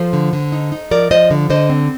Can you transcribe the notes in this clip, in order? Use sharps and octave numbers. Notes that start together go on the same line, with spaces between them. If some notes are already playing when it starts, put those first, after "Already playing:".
Already playing: F3 A4 C5
D3
D3
D#4
D#4
F3 A#4 D5
F3 C5 D#5
D3
D3 C5 D#5
C4